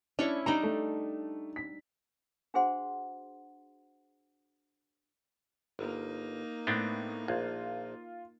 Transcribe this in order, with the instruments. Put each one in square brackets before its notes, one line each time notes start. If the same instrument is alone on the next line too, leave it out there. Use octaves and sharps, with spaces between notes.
[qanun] C#4 E4 C#6 [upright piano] D4
[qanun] G3 D4 D#4 [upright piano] A#5
[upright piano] A3
B6
[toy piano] D4 F#4 G#4 C5 F#5 C6
[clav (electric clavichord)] G1 [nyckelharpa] A#3 D#4
[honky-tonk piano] A2 [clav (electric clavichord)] B3 C4 D4
[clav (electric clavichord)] A#1 [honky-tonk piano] F4